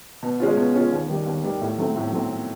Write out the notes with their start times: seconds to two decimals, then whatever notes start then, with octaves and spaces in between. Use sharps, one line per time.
0.23 B2
0.40 G#3 C#4 F4
0.57 B2
0.75 G#3 C#4 F4
0.92 D#2
1.09 D#3 G3
1.26 D#2
1.43 D#3 G3
1.61 A2
1.78 F#3 A3 C4
1.96 A2
2.13 F#3 A3 C4